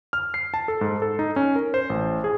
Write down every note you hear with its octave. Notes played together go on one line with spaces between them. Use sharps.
F6
C7
A5
A4
G#2
A4
D#4
C#4
A#4
C5
A1
G#4